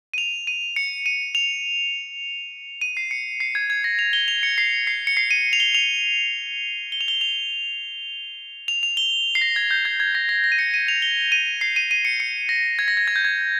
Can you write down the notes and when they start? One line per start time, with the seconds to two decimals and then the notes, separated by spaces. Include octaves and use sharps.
0.14 D#7
0.18 F7
0.47 D#7
0.76 C#7
1.06 D#7
1.35 F7
2.81 D#7
2.97 C7
3.11 C#7
3.40 C7
3.55 G#6
3.70 G#6
3.84 A#6
3.99 F7
4.13 G7
4.28 F7
4.43 C#7
4.58 C7
4.87 C7
5.07 C#7
5.17 C7
5.31 D#7
5.53 F7
5.60 G7
5.75 F7
6.92 G7
7.01 F7
7.08 G7
7.21 F7
8.68 F7
8.83 F7
8.97 G7
9.35 C7
9.41 A#6
9.56 G#6
9.71 G6
9.85 G#6
10.00 G#6
10.15 A#6
10.29 A#6
10.44 A#6
10.52 D#7
10.59 C#7
10.74 D#7
10.88 F7
11.02 G7
11.32 D#7
11.61 C7
11.76 D#7
11.91 D#7
12.05 C#7
12.20 C#7
12.49 A#6
12.79 G#6
12.88 A#6
12.97 G#6
13.08 G#6
13.16 G6
13.25 G#6